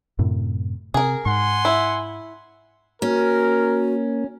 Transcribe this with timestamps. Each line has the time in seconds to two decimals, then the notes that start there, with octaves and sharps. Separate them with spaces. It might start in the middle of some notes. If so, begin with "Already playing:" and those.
0.19 F#2 A2 C3
0.94 C3 G#4 A#4
1.26 G#2 F#5 G#5 C6
1.65 E4
3.02 A#3 C#4 F#4 A#4